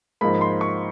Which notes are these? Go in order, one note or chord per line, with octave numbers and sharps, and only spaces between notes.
G#2 F3 A#3 D#4 B5
C6
C#6